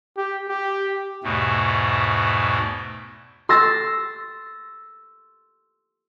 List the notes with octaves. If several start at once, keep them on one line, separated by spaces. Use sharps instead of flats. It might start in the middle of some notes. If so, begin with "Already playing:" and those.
G4
G4
E2 G#2 B2 A3
C6 E6 A6 A#6